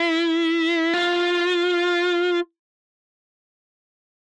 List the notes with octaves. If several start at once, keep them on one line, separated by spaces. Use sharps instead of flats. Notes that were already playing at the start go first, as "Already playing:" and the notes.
Already playing: E4
F4